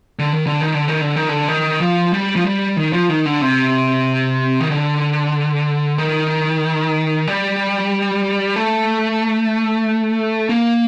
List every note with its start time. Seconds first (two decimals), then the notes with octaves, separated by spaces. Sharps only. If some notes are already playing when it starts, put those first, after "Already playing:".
0.19 D3
0.33 D#3
0.47 D3
0.61 D#3
0.74 D3
0.88 D#3
1.01 D3
1.16 D#3
1.29 D3
1.48 D#3
1.80 F3
2.12 G3
2.36 F3
2.44 G3
2.77 D#3
2.93 F3
3.09 D#3
3.25 D3
3.41 C3
4.60 D#3
4.70 D3
5.98 D#3
7.28 G3
8.56 A3
10.49 A#3